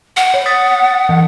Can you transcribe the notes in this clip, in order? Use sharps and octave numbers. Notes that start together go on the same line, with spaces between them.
F#5
C#5
D#6 A6 B6
E3